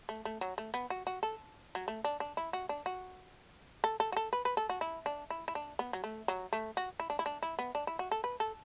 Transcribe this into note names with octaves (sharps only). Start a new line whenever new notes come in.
A3
A3
F#3
A3
B3
F#4
F#4
A4
F#3
A3
D4
D4
E4
F#4
D4
F#4
A4
A4
F#4
A4
B4
B4
A4
F#4
E4
D4
E4
E4
D4
B3
F#3
A3
F#3
A3
F#4
E4
D4
E4
D4
E4
B3
D4
E4
F#4
A4
B4
A4